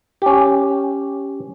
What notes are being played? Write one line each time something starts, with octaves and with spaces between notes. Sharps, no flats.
C#4 G4